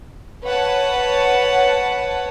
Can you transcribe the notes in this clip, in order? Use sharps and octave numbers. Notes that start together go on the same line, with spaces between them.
B4 C#5 F#5 A5